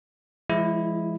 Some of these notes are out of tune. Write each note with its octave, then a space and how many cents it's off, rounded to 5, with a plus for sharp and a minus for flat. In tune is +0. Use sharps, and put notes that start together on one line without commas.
F3 -45 G#3 +0 E4 +0